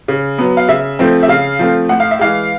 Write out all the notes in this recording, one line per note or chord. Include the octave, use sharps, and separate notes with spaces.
C#3
F#3 B3
F5
C#3 E5
F3 A3 C4
E5
C#3 F5
F3 A3 C4
A2 F#5
F5
E5
E3 G#3 F5